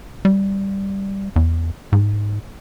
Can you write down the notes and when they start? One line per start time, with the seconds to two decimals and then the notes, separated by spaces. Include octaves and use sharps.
0.25 G3
1.36 E2
1.92 G#2